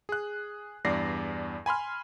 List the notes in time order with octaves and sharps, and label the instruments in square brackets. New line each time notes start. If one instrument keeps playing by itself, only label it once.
[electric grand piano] G#4 F#6
E2 G2 D5 A#6 C7
G#5 B5 C6 F6